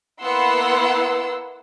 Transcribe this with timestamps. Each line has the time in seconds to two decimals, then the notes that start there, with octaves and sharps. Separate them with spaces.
0.22 A#3 B3 E4 F#5 C6 E6